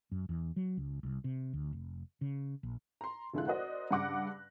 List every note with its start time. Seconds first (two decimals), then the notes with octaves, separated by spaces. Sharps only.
0.12 F#2
0.29 E2
0.56 F#3
0.77 C#2
1.03 C2
1.24 C3
1.53 D2
1.73 F1
2.21 C#3
2.63 A#1
3.01 A#5 C6
3.34 F1 D3 G#3 E4 F4 F#6
3.46 F#4 A#4 C5 D5 D#5
3.91 G2 C#3 F#5 D6 F#6 A#6